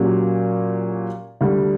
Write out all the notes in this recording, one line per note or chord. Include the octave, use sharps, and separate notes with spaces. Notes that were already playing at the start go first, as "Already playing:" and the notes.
Already playing: A#2 F#3 C#4 G4
D2 D3 G3